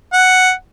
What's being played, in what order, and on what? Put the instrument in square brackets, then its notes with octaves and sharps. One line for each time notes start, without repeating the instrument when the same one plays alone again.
[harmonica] F#5